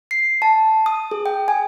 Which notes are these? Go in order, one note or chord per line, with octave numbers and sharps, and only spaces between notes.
C7
A5
D#6
G#4
G5
G#5